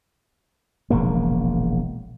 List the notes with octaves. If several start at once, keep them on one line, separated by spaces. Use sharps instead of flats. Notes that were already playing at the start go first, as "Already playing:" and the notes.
E1 A#1 C#3 A#3